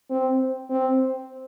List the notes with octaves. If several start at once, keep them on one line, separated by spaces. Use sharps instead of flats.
C4
C4